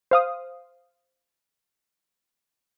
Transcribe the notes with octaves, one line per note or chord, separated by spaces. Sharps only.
C5 F5 D#6